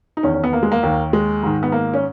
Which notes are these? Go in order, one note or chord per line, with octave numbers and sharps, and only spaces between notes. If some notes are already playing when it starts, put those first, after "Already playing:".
D#4
E2 D#3 C#4
C#4
B3
A#3
G#3
A#3
D#2 D#3
G#3
G#2 D#3
B3
A#3
C#4